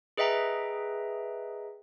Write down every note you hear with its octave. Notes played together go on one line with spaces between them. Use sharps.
G#4 B4 D#5 E5 G5 A#5